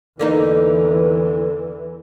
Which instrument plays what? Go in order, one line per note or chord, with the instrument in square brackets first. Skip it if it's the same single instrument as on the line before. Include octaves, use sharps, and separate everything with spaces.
[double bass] E2 E3 [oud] D3 A#3 D#4